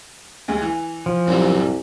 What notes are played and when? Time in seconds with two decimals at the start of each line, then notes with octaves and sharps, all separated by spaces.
0.48 D2 G#3
0.62 E3
1.06 F3
1.27 C2 F#2 F#3 G3